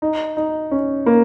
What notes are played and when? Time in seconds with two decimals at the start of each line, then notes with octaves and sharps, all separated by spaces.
0.02 D#4
0.37 D#4
0.71 C#4
1.06 A#3